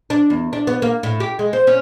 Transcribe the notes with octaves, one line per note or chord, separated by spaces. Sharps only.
D4
E2
D4
B3
A#3
A2
G4
G#3
C5
C#4